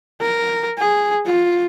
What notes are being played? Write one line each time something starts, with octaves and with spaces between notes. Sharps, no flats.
A#4
G#4
F4